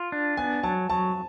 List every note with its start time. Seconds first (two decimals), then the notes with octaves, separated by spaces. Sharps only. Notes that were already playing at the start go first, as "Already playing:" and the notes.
Already playing: F4
0.12 D4
0.37 B3 G#5
0.63 F#3 A5
0.90 F#3 A5